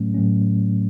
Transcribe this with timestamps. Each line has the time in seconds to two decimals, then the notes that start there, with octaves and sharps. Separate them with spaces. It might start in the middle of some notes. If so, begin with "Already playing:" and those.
Already playing: A2 F#3 A3 C#4
0.14 A2 F#3 A3 C#4